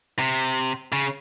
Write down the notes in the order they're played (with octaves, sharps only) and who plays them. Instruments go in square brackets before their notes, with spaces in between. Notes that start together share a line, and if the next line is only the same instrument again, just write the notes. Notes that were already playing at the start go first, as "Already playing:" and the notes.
[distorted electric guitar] C3
C#3